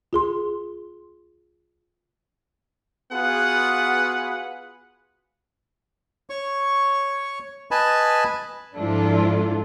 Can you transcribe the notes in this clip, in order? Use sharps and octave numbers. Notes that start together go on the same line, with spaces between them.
F4 G#4 C6
B3 F4 F#4 G#4 B4 F#5
C#5 C#6
B4 D#5 G#5 A5 B5
G#2 F3 D4 E4 F4 A4